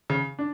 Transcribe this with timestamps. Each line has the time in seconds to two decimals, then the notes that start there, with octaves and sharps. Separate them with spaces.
0.10 C#3
0.39 D4